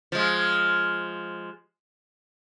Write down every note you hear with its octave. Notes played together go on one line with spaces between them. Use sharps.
F3 G#3